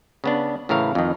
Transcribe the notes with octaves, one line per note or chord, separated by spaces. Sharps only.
C#3 B3 D4
A2 C#3 E3 A#4 F5
F2 D#3